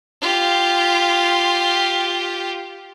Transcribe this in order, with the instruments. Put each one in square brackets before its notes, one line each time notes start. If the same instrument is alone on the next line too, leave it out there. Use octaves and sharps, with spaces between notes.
[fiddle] F4 G4